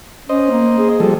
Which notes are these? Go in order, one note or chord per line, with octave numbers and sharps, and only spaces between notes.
C#4 C5 D#5
A#3
G#4
F3 G3 A4